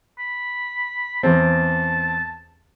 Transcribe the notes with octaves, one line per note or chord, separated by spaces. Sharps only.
B5
E2 C4 A5